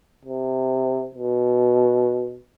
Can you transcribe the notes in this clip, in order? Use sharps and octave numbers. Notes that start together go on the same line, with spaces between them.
C3
B2